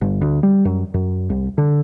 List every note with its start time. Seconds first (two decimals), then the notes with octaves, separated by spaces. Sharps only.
0.01 G1
0.21 D2
0.43 G3
0.65 F#2
0.94 F#2
1.30 C2
1.58 D3